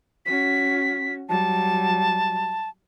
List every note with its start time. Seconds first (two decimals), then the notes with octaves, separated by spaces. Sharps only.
0.26 C#4 F#4 B6
1.29 F#3 G3 A5